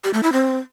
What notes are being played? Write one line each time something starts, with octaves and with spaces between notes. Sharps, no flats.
G4
A3
E4
C4